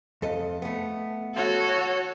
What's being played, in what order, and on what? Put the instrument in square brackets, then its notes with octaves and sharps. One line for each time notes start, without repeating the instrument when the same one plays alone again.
[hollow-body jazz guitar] F2 A4 D#5
A3 B3
[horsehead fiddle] F#4 C#5 [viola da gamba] A4